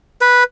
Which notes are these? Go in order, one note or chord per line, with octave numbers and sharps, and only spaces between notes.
B4